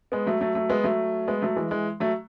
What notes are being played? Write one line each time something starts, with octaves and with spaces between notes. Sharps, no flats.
G#3 B3
F#3 A3
F#3 A3
F#3 A3
G#3 B3
F#3 A3
G#3 B3
F#3 A3
E3 G#3
E3 G#3
F#3 A3